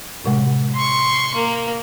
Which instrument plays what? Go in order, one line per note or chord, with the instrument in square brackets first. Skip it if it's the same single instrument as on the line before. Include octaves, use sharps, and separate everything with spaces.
[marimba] A2 C3 G#3
[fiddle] C6 C#6
A#3